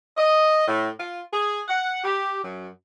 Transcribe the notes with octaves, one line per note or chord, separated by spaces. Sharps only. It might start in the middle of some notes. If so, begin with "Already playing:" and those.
D#5
A2
F4
G#4
F#5
G4
F#2